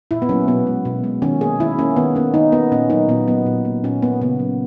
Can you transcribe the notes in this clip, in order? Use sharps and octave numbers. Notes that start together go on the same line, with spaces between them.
A#2 E4
B3
F#3 A#3 C#4
B2 B3
G#3
B2
G#3
D#3 C#4
A#3 G#4
D#3 E4
A#3 C#4
D#3 B3
A#3 C#4
D#3 D#4
A#3 B3
A#2 C#4
F#3 A#3 D#4
A#2 B3
F#3 A#3 B3
A#2
A#3
A#2 C#4
A#3 B3
C#3 B3
F#3 A#3